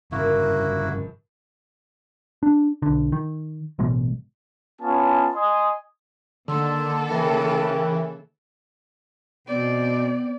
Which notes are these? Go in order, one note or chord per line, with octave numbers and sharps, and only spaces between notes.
G1 G2 A#2 C#3 A#3 E4 F#4
A#1
D4
B1 D3
D#3
A1 B2 G#3
B3 C#4 F4 G#5 A5
D#5 G#5 C6 D#6
D3 D#3 A#3 A4 C6 E6
C#3 E3 A#4 G5
B2 B3 C4 D5